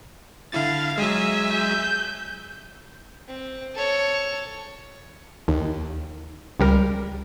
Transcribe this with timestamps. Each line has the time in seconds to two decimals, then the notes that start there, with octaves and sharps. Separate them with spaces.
0.52 D3 E4 F5 A6
0.98 F#3 G#3 E5 G#5
1.54 G6
3.28 C4
3.74 A4 C#5
5.48 D#2
6.60 C#2 G3 A#4